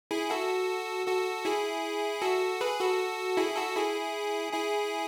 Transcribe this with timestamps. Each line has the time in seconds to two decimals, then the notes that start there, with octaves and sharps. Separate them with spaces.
0.11 E4 G#4
0.30 F#4 A4
1.07 F#4 A4
1.45 E4 G#4
2.22 F#4 A4
2.61 G#4 B4
2.80 F#4 A4
3.37 E4 G#4
3.56 F#4 A4
3.75 E4 G#4
4.53 E4 G#4